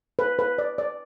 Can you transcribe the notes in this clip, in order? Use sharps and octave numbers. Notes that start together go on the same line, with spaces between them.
B4
B4
D5
D5